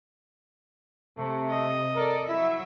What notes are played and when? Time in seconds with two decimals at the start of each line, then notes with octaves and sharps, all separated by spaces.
1.18 C3 A3
1.50 D#5
1.95 A4 A#4 D5
2.29 F#3 E4 E5